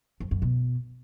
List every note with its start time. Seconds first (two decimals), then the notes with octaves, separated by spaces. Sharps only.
0.20 F2
0.31 F#2
0.42 B2